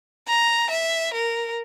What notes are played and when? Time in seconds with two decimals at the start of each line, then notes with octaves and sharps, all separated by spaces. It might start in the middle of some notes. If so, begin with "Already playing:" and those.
0.28 A#5
0.70 E5
1.14 A#4